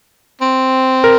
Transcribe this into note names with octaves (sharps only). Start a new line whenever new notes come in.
C4
A#4